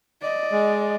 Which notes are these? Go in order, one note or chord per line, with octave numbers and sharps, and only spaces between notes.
D5 D#5
G#3